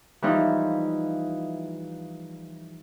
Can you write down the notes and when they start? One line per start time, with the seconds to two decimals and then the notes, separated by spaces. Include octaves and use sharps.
0.22 E3 F3 G3 D#4